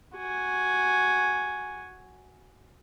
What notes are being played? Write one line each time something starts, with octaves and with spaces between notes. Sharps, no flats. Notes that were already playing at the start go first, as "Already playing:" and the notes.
F#4 G#5